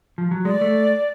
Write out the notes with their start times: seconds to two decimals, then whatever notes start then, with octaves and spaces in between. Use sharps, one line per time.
0.18 F3
0.31 F#3
0.45 G#3 D5
0.61 A3